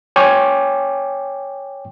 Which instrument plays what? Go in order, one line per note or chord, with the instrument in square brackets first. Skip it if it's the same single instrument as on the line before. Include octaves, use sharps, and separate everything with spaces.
[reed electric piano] C#5 G5 G#5 D6